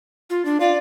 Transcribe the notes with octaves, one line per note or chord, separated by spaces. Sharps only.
F4
D4
F4 D5